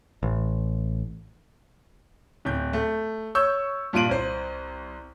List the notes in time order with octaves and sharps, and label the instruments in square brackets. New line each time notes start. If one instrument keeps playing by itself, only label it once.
[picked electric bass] A1
[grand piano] D1 G6
A3
C#5 C#6 E6 G6
G2 A#2 F4 D7 D#7 F#7
C2 C5